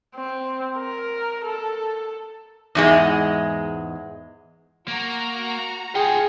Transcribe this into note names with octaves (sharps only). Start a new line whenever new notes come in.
C4
A#4
A4
E2 G#2 G#3
A#3 F#4 A#5
F4 G#4 F#5 G5